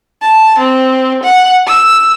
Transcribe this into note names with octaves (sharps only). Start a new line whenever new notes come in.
A5
C4
F#5
E6